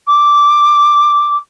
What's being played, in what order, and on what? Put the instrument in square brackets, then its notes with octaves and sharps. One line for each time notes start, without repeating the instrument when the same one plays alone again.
[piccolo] D6